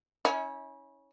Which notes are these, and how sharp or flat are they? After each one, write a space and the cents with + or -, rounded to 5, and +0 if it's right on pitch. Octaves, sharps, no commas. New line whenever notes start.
C#4 +0 E4 -35 E5 -45